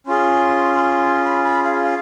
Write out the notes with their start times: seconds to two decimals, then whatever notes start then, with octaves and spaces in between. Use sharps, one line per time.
0.06 C#4 F4 G#4 C6
1.24 B5
1.44 B5
1.63 F5
1.83 F5